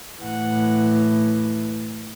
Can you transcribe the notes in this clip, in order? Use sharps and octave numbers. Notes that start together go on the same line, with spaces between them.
A2 E3 F#5